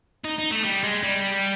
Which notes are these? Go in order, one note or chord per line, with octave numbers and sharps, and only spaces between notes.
D#4
D#4
A3
G3
G#3
G3